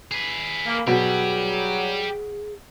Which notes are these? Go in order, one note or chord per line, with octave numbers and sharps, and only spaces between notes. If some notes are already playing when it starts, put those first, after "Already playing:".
G#4 B4
A#3
B2 F#3 G4 G#4 D5